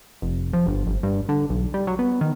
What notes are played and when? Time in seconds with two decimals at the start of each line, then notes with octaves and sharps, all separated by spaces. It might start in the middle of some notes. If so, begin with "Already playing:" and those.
0.22 F1
0.53 F3
0.67 G1
0.87 G1
1.03 G2
1.29 D3
1.49 B1
1.74 G3
1.87 F#3
1.99 B3
2.21 D#3